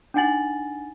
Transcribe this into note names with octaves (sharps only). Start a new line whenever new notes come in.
D4 D#4 F#5 G#5 A6 F#7